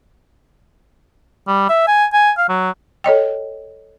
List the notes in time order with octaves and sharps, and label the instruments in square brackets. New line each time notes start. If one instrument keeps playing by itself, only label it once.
[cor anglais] G3
E5
G#5
G#5
F5
F#3
[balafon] A4 C#5 D#5 G5